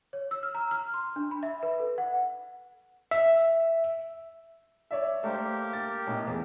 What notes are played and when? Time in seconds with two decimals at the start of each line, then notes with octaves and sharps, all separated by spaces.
0.13 C#5
0.31 E6
0.43 F6
0.55 A#5
0.71 F6
0.94 C6
1.16 D4
1.31 B5
1.43 E5
1.63 B4
1.80 A4
1.98 F#5
3.11 E5
4.91 C#5 D5 E5
5.24 A3 A#3 G4 A#4 C5
5.73 A6
6.07 B1 A2
6.27 E2